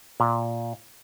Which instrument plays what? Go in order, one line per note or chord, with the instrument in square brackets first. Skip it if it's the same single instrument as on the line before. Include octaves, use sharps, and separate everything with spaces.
[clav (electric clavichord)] A#2